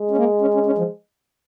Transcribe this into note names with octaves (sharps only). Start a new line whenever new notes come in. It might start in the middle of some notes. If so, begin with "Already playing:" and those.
Already playing: G#3
C#4
A#3
C#4
C#4
C#4
F3